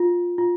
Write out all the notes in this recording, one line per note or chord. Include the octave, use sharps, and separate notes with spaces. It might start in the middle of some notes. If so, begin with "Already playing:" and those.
Already playing: F4
F4